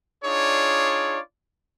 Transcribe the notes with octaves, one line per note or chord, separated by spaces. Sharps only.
D4 D#4 F4 G#4 C#5 D5